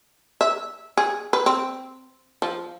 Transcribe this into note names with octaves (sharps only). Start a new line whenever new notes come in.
E5
G#4
B4
C4
F3